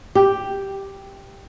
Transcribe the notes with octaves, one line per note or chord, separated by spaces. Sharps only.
G4